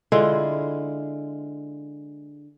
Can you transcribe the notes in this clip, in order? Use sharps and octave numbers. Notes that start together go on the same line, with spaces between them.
D3 G#3 E4 F4